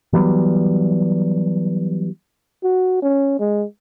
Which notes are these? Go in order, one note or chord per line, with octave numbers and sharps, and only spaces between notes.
E3 F#3 G3 B3
F#4
C#4
G#3